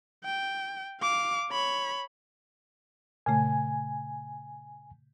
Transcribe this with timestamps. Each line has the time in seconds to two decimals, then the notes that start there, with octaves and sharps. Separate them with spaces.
0.24 G5
1.01 F5 D6
1.51 C#5 B5
3.26 A#2 C#3 A3 G#5